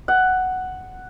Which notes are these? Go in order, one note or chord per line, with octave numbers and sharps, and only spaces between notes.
F#5